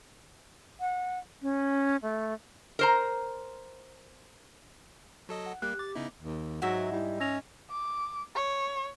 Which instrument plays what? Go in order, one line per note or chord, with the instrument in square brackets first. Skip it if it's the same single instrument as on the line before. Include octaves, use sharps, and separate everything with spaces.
[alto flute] F#5
C#4
A3
[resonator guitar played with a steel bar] A#4 C5 A#5
[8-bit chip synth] F#3 A4 D#5
[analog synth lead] F#5
[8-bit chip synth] G3 A#3 [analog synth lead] G4 [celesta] F#6
[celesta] D6 [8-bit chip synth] A6
[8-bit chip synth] C#3 D#4 E4 [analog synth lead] B3
[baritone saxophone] D#2
[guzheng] G#2 G#3 E5 [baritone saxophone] F#3 [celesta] F#5
[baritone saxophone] G3 [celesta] E4
[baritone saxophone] C#4 [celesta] E6 A#6 F7
[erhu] D6
C#5